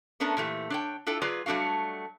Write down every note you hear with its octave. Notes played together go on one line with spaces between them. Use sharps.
A3 B3 C#4 D4 A#4
A#2 E3 A3 G4
D4 C#5 G5
D4 E4 F4 A4 G5
F#3 F4 G#4 B4 D5
F#3 G3 A3 D4 F#4 F5